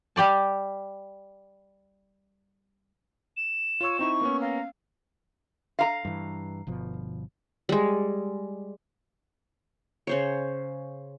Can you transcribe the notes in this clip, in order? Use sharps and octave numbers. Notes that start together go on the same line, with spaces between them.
G3 G4 D5 A5
E7
F4 C#5 E6
C4 D#4 E4 C#6
A#3 B3 C#4
F5 A#5
F5 A#5
G2 E3
G1 B2 F3
G3 G#3
C#3 C5 C#5